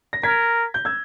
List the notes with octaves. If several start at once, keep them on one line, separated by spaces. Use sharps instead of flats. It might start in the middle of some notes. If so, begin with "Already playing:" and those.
A#6
A#4 G#6 B6
G6
E6 G#6